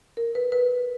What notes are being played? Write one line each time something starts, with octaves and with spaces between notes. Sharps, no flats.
A#4
B4
B4